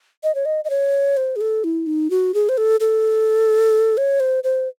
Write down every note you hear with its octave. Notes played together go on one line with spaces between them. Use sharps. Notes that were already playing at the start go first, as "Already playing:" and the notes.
D#5
C#5
D#5
D#5
C#5
C5
G#4
A4
E4
D#4
F#4
G#4
C5
A4
A4
C#5
C5
C5